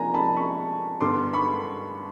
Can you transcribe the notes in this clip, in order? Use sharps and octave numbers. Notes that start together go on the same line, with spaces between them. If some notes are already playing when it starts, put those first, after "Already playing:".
Already playing: C3 F3 A#3 D4 G#5 A#5
A5 B5
B5 C#6
G2 D3 G3 B3 C6 D6
B5 C#6